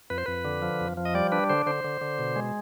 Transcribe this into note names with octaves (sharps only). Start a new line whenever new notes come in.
F2 B4
C5
F2 B4
D3
F3
F2
F3
D#5
G3 D5
D4 B4
D3 C5
D3 C5
D3
D3
B2
G#3